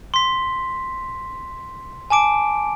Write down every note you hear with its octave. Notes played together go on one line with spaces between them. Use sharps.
C6 B6
G#5 A5 D6 D7